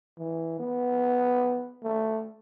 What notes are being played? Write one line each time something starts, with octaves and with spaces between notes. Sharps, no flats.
E3
B3
A3